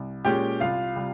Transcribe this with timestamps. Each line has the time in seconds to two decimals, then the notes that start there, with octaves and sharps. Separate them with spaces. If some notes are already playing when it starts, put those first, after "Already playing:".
Already playing: C2
0.25 A#2 G#3 C#4 G4 G5
0.60 C2 F4 F5
0.96 C3 G3